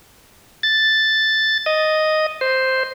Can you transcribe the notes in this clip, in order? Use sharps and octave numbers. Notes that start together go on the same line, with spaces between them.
A6
D#5
C5